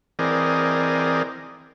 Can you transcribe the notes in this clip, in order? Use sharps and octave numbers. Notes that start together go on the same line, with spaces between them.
E3 C4 G#4 A#4 D5 D#5